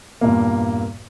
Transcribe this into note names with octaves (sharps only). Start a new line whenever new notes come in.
E2 G2 A#2 A#3